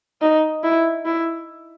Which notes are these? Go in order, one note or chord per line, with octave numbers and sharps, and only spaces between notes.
D#4
E4
E4